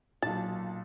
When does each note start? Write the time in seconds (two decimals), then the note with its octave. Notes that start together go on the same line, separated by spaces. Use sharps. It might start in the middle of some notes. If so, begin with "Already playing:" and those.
0.22 B1 A#2 A5